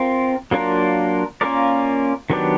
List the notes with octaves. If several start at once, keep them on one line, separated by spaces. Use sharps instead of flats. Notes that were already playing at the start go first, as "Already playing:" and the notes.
Already playing: C4 F4 A#4
F#3 A#3 D4 F4 A#4
A#3 C#4 F4 A#4 D5
D#3 F#3 B3 D4 G4